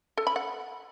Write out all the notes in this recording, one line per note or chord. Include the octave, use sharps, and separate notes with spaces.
A4
B5
F#5